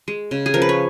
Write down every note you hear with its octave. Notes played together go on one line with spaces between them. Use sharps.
G#3
C#3
G#4
F3 A#4
B4
C#5